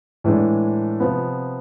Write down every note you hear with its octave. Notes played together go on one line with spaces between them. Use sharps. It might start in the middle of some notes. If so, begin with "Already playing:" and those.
A2 E3 G#3 D4
C3 F3 B3